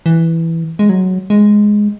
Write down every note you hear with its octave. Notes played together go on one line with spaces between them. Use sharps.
E3
G#3
F#3
G#3